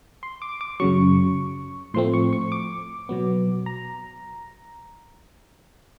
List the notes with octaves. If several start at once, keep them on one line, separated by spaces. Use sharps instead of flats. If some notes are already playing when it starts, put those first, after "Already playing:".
C6
D6
D6
F#2 C#3 F#3 C#6
A2 F3 A3 C4 C6
C#6
C#6
D6
B2 F#3 B3
A#5